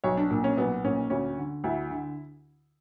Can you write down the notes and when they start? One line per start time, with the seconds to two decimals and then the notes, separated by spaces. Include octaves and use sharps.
0.04 B1 C#5
0.17 D4
0.31 A#2
0.44 C#4
0.57 B1 B3
0.84 A#2 C#4
1.10 D2 C#4
1.38 D3
1.64 D2 E4
1.90 D3